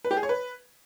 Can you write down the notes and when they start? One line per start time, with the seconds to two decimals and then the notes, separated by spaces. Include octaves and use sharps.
0.05 B4
0.11 G4
0.17 G#4
0.23 C#5
0.29 B4